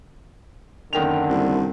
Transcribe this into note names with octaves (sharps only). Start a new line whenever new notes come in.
F#1 D3 D#3 F7
C2